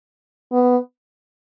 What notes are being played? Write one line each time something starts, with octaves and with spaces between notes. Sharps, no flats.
B3